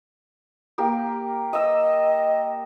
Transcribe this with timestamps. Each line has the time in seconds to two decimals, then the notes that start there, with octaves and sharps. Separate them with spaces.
0.78 A#3 G4
1.53 D#5 D#6 E6